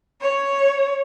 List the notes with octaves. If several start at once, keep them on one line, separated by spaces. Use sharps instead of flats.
C#5